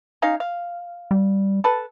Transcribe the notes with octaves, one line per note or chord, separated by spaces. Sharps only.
C#4 D#4 F5
F5
G3
A4 B4 A5